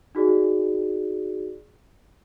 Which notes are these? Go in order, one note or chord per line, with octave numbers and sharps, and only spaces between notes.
D#4 F#4 G#4 D5